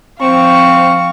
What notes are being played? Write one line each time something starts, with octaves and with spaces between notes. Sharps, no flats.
F3 C4 F5 C#6